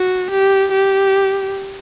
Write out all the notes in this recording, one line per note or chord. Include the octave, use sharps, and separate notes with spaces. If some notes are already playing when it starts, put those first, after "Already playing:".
Already playing: F#4
G4
G4